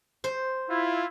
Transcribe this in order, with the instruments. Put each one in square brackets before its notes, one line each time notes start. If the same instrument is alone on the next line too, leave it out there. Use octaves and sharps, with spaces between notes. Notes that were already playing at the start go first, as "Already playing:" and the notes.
[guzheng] C5
[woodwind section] E4 [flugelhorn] F4